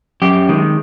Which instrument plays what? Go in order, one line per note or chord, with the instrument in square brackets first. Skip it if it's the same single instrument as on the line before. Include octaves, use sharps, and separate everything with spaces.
[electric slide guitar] F#2 G4
D#3 G#3